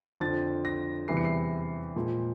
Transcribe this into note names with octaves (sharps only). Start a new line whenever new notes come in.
F2 D3 F3 A6
A#6
E2 C3 E3 G3 C7
C#7
C7
A#2 F3 G#3